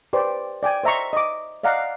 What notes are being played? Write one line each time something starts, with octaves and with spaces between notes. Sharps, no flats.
G4 B4 C5 D5
D5 G5 G#5
C5 D#5 E5 A#5 C6 C#6
D#5 D6
D5 D#5 F5 F#5 A#5